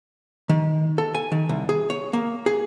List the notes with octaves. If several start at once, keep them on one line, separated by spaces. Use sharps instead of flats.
D#3
A4
G#5
D#3
C2
G#4
C#5
A#3
G#4